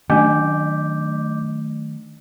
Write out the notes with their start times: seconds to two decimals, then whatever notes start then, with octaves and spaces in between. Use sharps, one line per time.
0.10 D#3 F#3 A3 C#4 D4 D#5 D6 G6